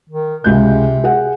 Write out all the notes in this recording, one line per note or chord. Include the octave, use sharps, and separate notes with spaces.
D#3
C#2 C3 G#3 G6
G#4 F#5